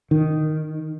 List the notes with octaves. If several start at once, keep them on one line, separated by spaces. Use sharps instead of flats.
D#3